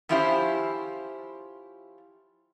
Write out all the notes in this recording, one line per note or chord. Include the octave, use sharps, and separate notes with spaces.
F3 C#4 E4 F4 G4 C5